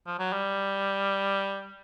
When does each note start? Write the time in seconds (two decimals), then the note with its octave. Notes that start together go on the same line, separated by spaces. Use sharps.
0.06 F3
0.19 F#3
0.33 G3